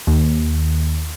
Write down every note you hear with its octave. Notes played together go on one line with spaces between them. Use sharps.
D#2